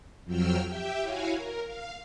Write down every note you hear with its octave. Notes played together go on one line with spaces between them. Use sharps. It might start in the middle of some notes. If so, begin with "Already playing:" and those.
F2 F3 F#3 G5 E6 F6
G4 E5 G5
E4 F#4 C#5 F5 G#5
A#4
F5